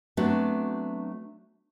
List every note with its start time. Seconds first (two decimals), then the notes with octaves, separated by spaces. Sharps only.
0.17 F#3 A3 B3 C4 D4 F#4